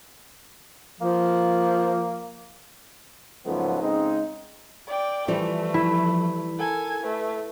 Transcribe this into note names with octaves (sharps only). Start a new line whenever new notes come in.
F3 A#3
C#2 G#2 F3 F#3 A3 B3
C#3 G#3 C4 D#4
D5 G5
E3 F3 G3 A3 C5
E4
A4 A#4 G#5
A3 B4